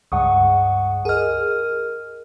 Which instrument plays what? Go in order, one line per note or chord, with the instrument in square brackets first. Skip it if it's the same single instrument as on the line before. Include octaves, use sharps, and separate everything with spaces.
[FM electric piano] C#2 G2 [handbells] F#5 C#6 D#6
[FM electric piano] G#4 D#5 [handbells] A#4 F6